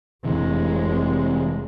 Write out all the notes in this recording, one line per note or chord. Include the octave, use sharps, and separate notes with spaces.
F1 C3 E3 G#3